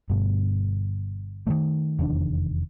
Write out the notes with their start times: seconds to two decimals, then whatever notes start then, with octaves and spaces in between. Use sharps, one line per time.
0.10 G1 G2 B2
1.47 D#3 E3 A3
1.99 F1 E2 D#3 D4